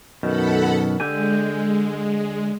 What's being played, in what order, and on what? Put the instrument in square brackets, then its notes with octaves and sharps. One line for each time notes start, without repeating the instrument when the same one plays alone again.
[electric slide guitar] F#2 B2 D#3 [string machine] A4 F#5 B5
[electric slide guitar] D3 G4 G#5 [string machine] G#3